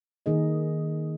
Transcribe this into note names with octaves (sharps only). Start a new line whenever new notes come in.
D#3 A#3 D#4 G#4 D#5